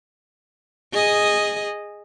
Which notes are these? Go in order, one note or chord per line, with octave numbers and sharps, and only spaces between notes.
G#4 D#5